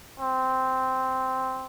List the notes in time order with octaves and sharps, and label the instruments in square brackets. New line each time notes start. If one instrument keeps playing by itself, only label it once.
[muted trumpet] C4